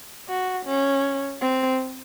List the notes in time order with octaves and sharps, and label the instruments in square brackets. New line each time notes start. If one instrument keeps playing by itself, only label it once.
[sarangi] F#4
C#4
C4